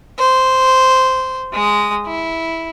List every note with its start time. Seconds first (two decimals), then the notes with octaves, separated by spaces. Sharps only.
0.19 C5
1.53 G#3 D#6
2.06 E4